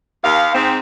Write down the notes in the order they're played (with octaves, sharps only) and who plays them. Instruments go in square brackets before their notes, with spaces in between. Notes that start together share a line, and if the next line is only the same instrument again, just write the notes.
[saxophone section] D#2 F5
G#2 C4